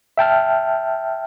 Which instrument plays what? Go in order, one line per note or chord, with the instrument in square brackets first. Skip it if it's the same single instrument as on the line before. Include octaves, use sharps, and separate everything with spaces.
[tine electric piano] E5 G5 A5 F6